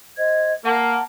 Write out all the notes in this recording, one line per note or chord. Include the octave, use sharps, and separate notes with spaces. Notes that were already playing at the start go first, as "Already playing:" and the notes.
C5 D#5 G#6
A#3 F#5 A5